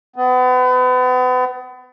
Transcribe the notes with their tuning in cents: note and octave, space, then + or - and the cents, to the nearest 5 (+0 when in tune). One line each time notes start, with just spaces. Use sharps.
B3 +35